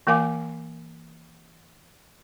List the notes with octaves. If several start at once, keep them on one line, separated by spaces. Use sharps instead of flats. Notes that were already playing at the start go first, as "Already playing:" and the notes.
E3 A#3 A#4 F5 G#5 D6